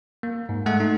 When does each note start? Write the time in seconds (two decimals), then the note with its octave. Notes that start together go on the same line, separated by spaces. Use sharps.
0.23 A#3
0.49 G#2
0.66 G#3 A3 A4 F#5
0.80 A3 D#4